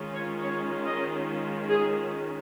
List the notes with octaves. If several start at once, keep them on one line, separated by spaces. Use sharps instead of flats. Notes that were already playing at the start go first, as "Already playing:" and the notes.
Already playing: D#3 G#3 C#4 F4
C#5
C#5
D#5
G#4